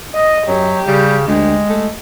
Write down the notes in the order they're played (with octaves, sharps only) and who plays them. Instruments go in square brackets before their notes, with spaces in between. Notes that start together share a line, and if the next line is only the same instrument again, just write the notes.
[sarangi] D#5
[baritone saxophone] F#2 [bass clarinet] F#3 [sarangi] G4
[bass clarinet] C#3 [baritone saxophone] G3
[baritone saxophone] D2 [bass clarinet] G#3
[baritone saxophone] A3